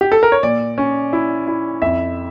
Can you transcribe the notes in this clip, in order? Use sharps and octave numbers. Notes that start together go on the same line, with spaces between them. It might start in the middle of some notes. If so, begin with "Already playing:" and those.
G4
A4
A#4
C#5
A#2 D5
C#4
E4
E4
F2 E5